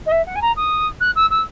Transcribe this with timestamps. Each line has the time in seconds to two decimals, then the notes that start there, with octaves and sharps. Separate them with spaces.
0.06 D#5
0.11 E5
0.25 F#5
0.35 G#5
0.41 A#5
0.56 D#6
1.00 F#6
1.15 E6
1.30 E6